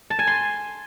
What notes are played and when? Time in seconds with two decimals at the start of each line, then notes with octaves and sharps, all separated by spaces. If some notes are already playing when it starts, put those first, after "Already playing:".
0.10 A5
0.19 G#5
0.27 C6